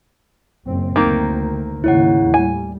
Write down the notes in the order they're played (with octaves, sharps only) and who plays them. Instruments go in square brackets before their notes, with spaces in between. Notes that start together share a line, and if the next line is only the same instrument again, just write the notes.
[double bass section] F#1 A#2 C4
[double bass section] D2 [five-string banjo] D#3 A#3 C4
[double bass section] D#2 G#2 C#3 [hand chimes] E4 C#5 F#5
[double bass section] A2 G3 [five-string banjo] G#5